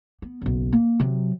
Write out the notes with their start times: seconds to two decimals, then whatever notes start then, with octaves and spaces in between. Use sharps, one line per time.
0.22 B3
0.42 F#1 B1
0.73 A#3
1.00 C3 F#3